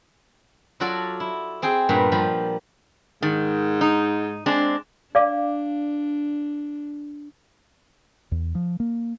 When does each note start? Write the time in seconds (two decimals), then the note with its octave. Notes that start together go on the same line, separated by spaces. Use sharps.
0.80 F#3 F4 F#4 A4 D5
1.20 E4
1.62 C4 G#4 G5 G#5
1.89 G2 A#2 B3 A#4
2.12 A#2 F3 G3
3.22 G#2 D#3
3.81 D#4
4.46 G#3 C4 D4
5.15 D4 D5 F5 D6
8.31 E2
8.55 F3
8.80 A#3